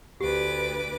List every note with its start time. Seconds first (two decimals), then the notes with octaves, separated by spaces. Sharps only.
0.21 D2 G4 B4 D6